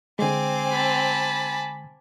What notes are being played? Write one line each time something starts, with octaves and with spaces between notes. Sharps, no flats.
D3 G#3 C4 G#5 D6
A5 B5